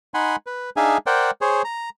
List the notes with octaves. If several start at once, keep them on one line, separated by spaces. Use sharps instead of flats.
D#4 F#5 G#5 B5 C6
B4
D4 D#4 G#4 E5 F5 G#5
A#4 C5 D5 F#5 G5
G#4 C5 C#5
A#5